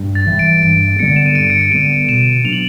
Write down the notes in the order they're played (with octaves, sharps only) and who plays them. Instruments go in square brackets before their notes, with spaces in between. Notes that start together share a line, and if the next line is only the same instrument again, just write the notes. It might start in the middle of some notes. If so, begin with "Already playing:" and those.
Already playing: [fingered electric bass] G2
[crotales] A6
[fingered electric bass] E3 G3
[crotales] D7
[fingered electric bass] G2 [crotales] D7
[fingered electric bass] D3 G3 B3 [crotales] C#7
[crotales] E7
D#7
[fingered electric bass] G2 [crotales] D7
[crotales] C#7
D7
[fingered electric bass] D3 G3 B3 [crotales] D#7
[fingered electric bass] B2 [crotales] E7
[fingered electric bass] F#3 B3 D4 [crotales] F7
[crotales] F#7